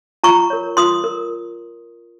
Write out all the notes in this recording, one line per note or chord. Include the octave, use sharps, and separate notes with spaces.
F4 A#5 C#6
A#4 C#5
F4 C6 D#6
A#4